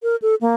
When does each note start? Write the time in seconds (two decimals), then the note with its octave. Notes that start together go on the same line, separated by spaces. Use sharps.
0.03 A#4
0.22 A4
0.41 A#3